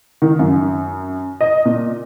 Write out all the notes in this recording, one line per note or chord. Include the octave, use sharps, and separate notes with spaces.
D#3
F#2
D#5
A#2